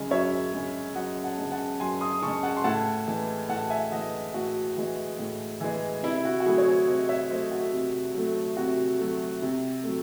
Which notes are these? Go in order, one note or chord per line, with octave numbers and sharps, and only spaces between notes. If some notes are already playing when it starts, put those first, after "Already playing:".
Already playing: F#2 C#3 G#3
F#2 C#5 E5
C#3 G#3
F#2 D#5 F#5
F#5 A5
C#3 G#3
F#5 A5
F#2 G#5 C6
C6 D#6
C#3 G#3 A5 C#6
F#5 A5
C6
A2 F#5 A5
E3 G#3
A2 F#5 A5
E5 G#5
E3 G#3 D#5 F#5
A2 F#4
E3 G#3
A2
E3 G#3
C3 E4
E4
F#4
F#4
F#3 A3 E4 G#4
C#5
G#4 C5
C3 C5 D#5
C#5 E5
F#3 A3 C5 D#5
F#4 A4
C3
F#3 A3
C3 F#4
F#3 A3
C3
F#3 A3